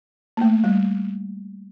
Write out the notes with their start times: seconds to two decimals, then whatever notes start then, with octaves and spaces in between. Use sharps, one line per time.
0.37 A#3
0.41 A3
0.64 G3